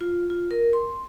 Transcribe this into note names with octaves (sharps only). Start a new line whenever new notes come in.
F4
F4
A#4
C6